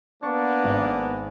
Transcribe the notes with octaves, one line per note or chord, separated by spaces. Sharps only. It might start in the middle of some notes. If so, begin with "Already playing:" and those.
A#3 B3 D4 C#6 A6
G#1